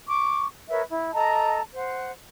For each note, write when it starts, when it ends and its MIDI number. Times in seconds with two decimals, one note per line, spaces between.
0.08 0.46 85
0.08 0.46 86
0.69 0.82 70
0.69 0.82 71
0.69 0.82 73
0.69 0.82 76
0.89 1.11 64
1.13 1.61 69
1.13 1.61 75
1.13 1.61 81
1.13 1.61 82
1.74 2.11 72
1.74 2.11 78